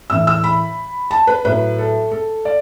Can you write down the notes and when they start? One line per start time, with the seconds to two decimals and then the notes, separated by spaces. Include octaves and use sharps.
0.10 A2 E3 E6
0.27 E6
0.44 B5
1.11 A5
1.27 B4
1.45 A2 F#3 B4
1.78 A4
2.12 A4
2.45 D5